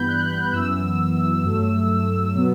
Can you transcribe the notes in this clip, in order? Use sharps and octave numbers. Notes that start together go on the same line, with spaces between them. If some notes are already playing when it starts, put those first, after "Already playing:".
Already playing: G2 E3 G3 B3 B5 G6
F#6
F#6
F#2 E3 B3 E6
G2 F#3 A3
B2 F#3 B3